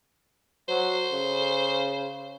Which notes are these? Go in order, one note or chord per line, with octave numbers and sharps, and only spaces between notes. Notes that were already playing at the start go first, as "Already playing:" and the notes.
F#3 C5
C#3